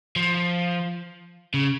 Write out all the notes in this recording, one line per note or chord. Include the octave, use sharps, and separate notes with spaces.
F3
C#3